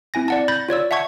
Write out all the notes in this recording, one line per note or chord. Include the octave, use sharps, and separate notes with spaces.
C4 E4 G#5 A#6
D5 F#5 A5
B5 G6 A6 A#6
F4 C#5 D5 E6
E5 F#5 A5 C#6 G#6